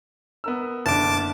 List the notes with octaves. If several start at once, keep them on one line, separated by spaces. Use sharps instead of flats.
B3 A#4 E6
F#1 D3 A5 D6